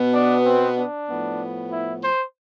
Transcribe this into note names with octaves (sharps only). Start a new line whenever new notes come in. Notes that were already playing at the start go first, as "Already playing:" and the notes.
Already playing: B2 B3
D4
C4
D4
A2 F3 B3
E4
C5